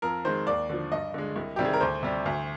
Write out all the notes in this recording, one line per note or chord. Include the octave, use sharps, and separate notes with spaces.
F2 A#4
D#3 G#3 C5
D#2 D5
D3 F3
G2 D#5
D3 G#3
C2
C3 D#3 G3 G4
G#4
A#4
D2 C5
C3 G3
D2